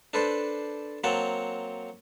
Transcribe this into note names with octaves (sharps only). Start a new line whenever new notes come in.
D4 A4 B4 C5 D5
F#3 A#3 C4 F#5 A5